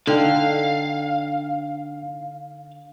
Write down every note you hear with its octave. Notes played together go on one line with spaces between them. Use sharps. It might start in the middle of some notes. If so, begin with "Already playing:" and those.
D3 D4 D#4 F5 G5